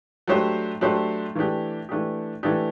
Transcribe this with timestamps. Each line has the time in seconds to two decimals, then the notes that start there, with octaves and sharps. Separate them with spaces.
0.28 F#3 A3 D4 G4 C5
0.81 F#3 A3 D4 G4 C5
1.35 E3 A3 D4 G4
1.89 E3 A3 D4 G4
2.43 E3 A3 D4 G4